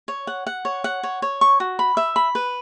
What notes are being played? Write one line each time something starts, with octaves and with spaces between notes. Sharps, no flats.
C#5
F#5
F#5
C#5
F#5
C#5
C#5
C#6
F#4
B5
E5
B5
B4